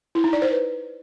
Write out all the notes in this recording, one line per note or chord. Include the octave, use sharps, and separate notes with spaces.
E4
D#4
D5
C5
B4